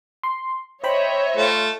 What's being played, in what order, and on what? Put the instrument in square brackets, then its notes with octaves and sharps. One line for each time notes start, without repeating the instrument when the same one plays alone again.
[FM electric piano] C6
[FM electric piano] C5 G5 B5 [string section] C#5 D#5 E5
[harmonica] A3 F4